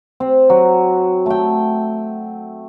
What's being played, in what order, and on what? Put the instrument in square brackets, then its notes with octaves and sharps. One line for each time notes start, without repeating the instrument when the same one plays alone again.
[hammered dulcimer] C4
F#3
A3 G5